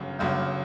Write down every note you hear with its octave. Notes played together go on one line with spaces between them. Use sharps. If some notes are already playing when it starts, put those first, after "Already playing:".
Already playing: G1 F#2 C#3
G1 F#2 C#3 G3